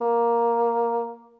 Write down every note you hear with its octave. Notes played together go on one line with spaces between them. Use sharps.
A#3